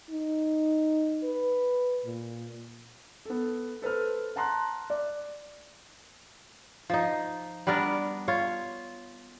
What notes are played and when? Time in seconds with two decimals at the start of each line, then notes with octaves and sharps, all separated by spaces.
0.10 D#4
1.24 B4
2.05 A#2
3.25 B3 A4
3.82 A4 B4 C5 F6
4.36 F#5 A5 A#5 C6 F#6
4.90 D5
6.90 F3 D#4
7.67 G3 B3 D4 A#4
8.28 F4 C#5